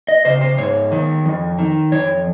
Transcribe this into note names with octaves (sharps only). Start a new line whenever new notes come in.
D#5
C#3 C5
C5
G#2 C#5
D#3
F2
D#3
F2 C#5